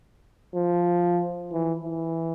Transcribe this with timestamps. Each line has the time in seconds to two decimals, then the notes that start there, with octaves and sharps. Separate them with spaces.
0.55 F3
1.52 E3
1.84 E3